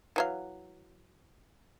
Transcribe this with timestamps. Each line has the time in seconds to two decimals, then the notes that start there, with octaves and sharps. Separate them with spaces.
0.16 E3 F#3 F5